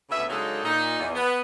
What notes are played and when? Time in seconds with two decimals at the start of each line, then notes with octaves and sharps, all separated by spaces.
0.10 D2 C#3 B3 C#4 E5
0.29 C#3 F#3 G#3 D4 D#4 A4
0.64 A#2 D#4
0.99 E2
1.15 B3